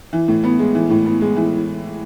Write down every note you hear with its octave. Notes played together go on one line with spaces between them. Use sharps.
E3
A2
B3
G#3
E3
A2
B3
G#3
E3